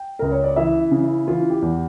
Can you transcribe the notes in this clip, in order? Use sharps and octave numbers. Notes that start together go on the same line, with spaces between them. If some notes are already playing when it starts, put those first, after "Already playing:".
Already playing: G5
C#2 A#4
C#5
D5
E3 E5
C#3
E4
E3 F4
G4
E2